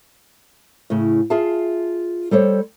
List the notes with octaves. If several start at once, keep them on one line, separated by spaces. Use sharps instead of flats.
A2 C#3
F4 G#4 E5 F5 A5
G3 A4 C5 C#5